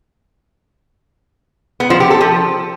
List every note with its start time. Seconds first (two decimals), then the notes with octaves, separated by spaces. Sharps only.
1.80 B3
1.90 F3
2.00 G4
2.10 A4
2.20 F3